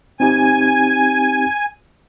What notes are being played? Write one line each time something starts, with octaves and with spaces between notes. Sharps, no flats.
C4 D#4 G4 G#5